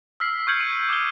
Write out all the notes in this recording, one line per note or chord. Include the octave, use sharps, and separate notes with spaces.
E6 F6 B6 C7
C#6 F6 G6 G#6 C#7 F#7
D#7
D6 D#6 G6 G7